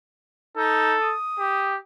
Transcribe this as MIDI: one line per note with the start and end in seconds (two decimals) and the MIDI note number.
0.57 0.94 63
0.57 1.14 69
1.01 1.74 87
1.39 1.78 67